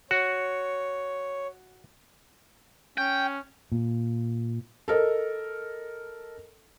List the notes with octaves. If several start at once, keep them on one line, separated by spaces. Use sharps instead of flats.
F#4 C#5
C#4 G5
A#2
A4 A#4 D#5